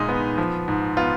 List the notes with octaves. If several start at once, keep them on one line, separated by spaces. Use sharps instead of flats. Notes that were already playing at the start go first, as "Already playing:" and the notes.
Already playing: A#2 G#3 D#4
B3
F3
G#2
B3 F4